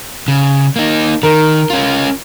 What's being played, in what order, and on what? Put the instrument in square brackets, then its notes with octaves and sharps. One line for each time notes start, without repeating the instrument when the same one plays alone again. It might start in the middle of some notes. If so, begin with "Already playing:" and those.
[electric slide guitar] C#3
A#3 D#4
[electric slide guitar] D#3 [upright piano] A#4
[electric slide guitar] C#4 F4